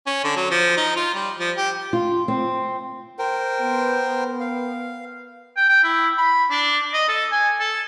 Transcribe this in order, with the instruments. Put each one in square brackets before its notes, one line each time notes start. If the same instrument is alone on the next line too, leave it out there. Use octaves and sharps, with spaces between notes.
[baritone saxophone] C#4
D3
F#3
F3
D#4
F4
G3
F3
G4
[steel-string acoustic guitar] F4
C4
[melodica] A#4 C5 G5
[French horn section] B3
[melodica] F5
[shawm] G5
G5
E4
B5
D4
D#5
A4
G#5
A4